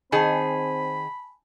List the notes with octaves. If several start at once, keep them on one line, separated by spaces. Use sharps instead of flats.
D#3 C4 G#4 G#5 A5 B5